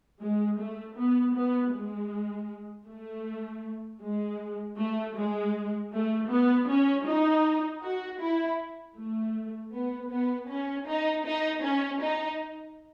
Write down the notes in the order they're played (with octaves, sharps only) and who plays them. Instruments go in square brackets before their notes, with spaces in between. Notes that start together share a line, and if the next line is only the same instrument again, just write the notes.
[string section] G#3
A3
B3
B3
G#3
A3
G#3
A3
G#3
A3
B3
C#4
D#4
F#4
E4
A3
B3
B3
C#4
D#4
D#4
C#4
D#4